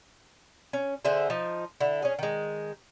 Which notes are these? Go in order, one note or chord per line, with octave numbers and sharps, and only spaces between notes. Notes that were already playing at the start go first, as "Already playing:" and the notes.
C#4
D3 G#4 C5 E5
F3 D#4
D3 E4
C#4 G#4
D#3 G#3